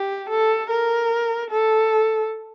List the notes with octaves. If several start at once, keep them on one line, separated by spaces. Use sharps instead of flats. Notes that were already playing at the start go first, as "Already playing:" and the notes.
Already playing: G4
A4
A#4
A4